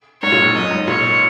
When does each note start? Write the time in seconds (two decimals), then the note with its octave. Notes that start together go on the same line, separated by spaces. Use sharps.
0.22 G#2 C#5
0.32 A#2
0.42 G#2
0.55 F#2 D#5
0.71 G#2
0.87 A#2 C#5